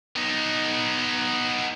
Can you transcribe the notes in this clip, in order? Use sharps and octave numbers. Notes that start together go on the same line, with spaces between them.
B3 D#4